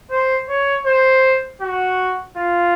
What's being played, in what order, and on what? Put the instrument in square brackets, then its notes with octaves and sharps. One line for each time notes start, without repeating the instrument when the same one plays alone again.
[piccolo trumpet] C5
C#5
C5
F#4
F4